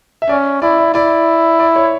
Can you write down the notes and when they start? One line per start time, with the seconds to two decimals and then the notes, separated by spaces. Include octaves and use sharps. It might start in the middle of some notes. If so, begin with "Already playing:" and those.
0.22 E5
0.29 C#4 D5
0.62 E4 D5
0.78 D5
0.94 E4 D5
1.60 D5
1.76 C#5